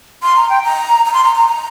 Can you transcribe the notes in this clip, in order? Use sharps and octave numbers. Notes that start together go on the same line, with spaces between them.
C6
A#5
G5
A#5
A#5
C6
A#5
A#5
A#5